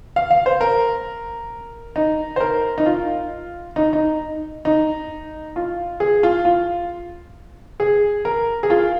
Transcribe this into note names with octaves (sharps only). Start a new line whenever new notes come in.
F5
F5
C5
A#4
D#4
C5
A#4
D#4
F4
D#4
D#4
D#4
F4
G#4
F4
F4
G#4
A#4
G#4
F4